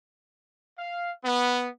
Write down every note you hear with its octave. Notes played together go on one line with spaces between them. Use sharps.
F5
B3